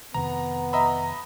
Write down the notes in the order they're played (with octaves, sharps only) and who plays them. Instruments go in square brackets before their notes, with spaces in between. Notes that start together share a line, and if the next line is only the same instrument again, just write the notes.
[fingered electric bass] F2 C3 D#3 [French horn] B3 [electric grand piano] A#5
[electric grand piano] D#5 E5 B5 [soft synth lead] A#5